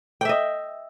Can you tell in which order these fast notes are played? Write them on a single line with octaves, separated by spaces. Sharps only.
G5 E5 D#5